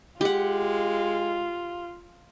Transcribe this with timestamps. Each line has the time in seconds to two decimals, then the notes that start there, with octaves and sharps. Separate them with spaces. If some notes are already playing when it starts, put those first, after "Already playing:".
0.21 G#3 F4 G4 F#5